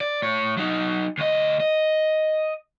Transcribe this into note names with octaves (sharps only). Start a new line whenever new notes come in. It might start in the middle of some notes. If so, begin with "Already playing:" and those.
D5
A2 C#5
F#3 D#4
D2 D#5
D#5